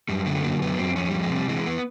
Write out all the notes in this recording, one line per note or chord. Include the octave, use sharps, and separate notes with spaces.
F#2 G3
D3 A3
F#3 A#3
F#2 B3
F#2 C4
F2 C#4
F2 G3
G#3
C3 G3
E3 G#3
B3